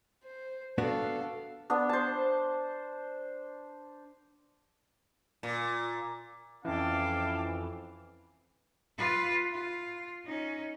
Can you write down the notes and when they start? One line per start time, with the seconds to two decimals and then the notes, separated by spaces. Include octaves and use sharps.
0.24 C5
0.78 B3 D4 F#4 A4 F5
1.70 B3 D4
1.89 C5 A5
5.43 A#2
6.65 F2 E3 C#4 F5 G5 A5 D6
8.97 F4 B4
9.52 F4
10.25 C#4 D#4